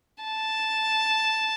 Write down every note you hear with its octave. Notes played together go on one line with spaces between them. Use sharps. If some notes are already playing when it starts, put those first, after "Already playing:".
A5